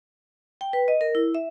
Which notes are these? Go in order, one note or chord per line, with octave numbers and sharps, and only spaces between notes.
G5
B4
D#5
A#4
E4
E5